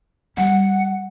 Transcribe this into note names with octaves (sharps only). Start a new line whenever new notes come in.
G3 F#5